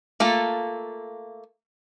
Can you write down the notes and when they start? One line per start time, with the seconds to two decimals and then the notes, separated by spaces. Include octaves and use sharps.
0.20 A3 A#3 F4 A4